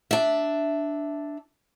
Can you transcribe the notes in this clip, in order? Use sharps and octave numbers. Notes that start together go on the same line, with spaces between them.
D4 E5